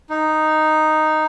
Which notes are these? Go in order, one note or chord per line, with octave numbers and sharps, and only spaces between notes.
D#4